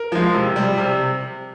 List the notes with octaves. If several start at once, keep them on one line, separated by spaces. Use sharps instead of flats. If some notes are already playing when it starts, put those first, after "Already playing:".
Already playing: A#4
F3 G#3
C3
G3
C3